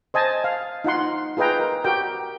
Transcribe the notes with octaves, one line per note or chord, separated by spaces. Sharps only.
C5 D#5 G#5 A5
F5
D#4 F4 F#5 C6
F4 G#4 B4 D#5 G5 A#5
A#4
F#4 G4 A#4 G5